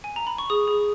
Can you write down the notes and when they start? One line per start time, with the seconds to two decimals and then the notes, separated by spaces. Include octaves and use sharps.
0.04 G#5
0.16 A#5
0.27 B5
0.38 C#6
0.50 G#4 D#6
0.68 G#4